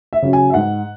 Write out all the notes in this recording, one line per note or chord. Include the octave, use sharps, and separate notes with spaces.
E5
C#3 F#3 C#4
G#5
E5
G#2 F#5